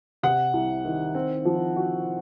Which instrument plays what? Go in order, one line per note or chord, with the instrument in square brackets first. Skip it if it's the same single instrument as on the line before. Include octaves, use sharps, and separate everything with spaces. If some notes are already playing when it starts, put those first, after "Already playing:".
[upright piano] C3 [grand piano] F#5
[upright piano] C2
D#3
C4
F3
F#4